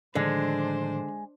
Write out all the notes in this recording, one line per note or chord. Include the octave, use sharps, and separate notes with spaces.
A2 D3 D#3 F3 G#3 D4 C5